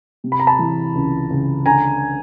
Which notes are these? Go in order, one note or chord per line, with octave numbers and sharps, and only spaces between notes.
C3
B5
A#5
A5 B5
E3
C#2
C#2
D3 G#5 A#5